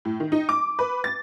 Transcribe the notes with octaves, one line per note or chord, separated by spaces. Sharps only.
A2
D#3
D#4
D6
B4
A6